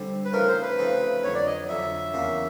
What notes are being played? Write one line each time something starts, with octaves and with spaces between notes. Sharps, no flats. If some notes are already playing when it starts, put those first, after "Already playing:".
Already playing: D3 G3 C4
B4
C#3 F3 A3 C4 D#4 A#4
C5
B4
C#3 F3 A3 C4 D#4
F2 D3 F#3 C#5
D5
D#5
F2 D3 F#3 E5
E2 C#3 F#3 A#3 C#4